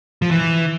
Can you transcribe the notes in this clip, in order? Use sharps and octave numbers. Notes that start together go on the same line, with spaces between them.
F3
E3